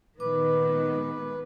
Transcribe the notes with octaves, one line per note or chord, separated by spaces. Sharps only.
A#2 D#3 G#3 B3 B4 D6